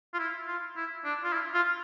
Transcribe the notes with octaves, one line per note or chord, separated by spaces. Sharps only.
F4
E4
F4
E4
D4
F4
E4
F4